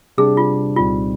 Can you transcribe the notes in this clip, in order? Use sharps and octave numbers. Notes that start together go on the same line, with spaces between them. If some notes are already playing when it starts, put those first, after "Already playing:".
C3 G3 D4 G#4
F4
C2 A#2 G3 C4 D#4 F4